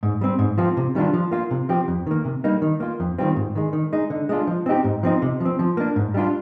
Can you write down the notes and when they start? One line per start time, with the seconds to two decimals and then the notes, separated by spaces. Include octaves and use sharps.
0.03 G#2
0.21 G3 C4
0.39 G#2
0.58 F3 C4 F4
0.77 C3
0.95 D#3 G3 D4 F4
1.13 F3
1.31 A#3 F4
1.51 C3
1.69 F3 C4 G4
1.88 F2
2.07 D#3 A#3
2.25 C3
2.44 G3 A#3 D#4
2.62 D#3
2.80 A#3 F4
3.00 F2
3.18 D#3 G3 C4 F4
3.36 G#2
3.55 D#3 G#3
3.73 D#3
3.93 G#3 D#4
4.10 D3
4.29 G#3 D4 F4
4.47 F3
4.66 C4 D#4 G4
4.84 G#2
5.03 F3 C4 D#4
5.22 C3
5.40 F3 C4
5.59 F3
5.77 A#3 D4
5.96 G#2
6.14 G3 D4 F4